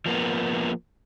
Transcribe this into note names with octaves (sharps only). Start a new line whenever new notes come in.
F3 A#3 B3